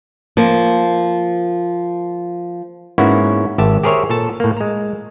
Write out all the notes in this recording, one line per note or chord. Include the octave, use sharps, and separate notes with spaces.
F3 A#3
G#2 A#3 B3 C#4 E4 F#4
G#1 G4 E5 A5
G4 G#4 A#4 C5 C#5 E5
A#2 A4 A5
A2 A#3
G#3 A#5